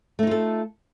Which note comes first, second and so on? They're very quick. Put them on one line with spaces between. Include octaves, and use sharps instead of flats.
A3 D#4 F4 A4